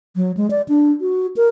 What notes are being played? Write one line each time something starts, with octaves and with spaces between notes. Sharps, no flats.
F#3
G#3
D5
D4
F#4
A#4